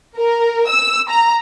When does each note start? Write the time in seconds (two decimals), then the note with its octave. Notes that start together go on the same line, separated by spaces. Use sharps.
0.18 A#4
0.68 E6
1.09 A#5